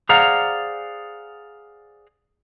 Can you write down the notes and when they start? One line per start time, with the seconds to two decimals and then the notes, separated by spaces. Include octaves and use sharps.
0.09 G#4 C5 D5 F5 F#5 A#5